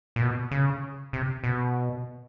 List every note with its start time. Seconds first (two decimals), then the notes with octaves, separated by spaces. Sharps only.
0.16 A#2
0.22 B2
0.51 C#3
1.13 C3
1.44 B2